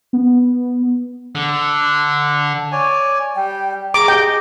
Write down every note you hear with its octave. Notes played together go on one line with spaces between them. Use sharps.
B3
D3
C#5 D5 G#5
G3 G5
G#4 A#5 D6
G4 D#5 G5